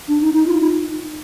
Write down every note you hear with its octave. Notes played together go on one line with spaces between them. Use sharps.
D4
D#4
D#4
F4
D#4